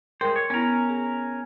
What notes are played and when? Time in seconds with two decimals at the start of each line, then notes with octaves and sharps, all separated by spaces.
0.21 G#3 G#4 A#4 C5 G5
0.36 C#5
0.50 B3 C#4 E4 A#4
0.89 G#4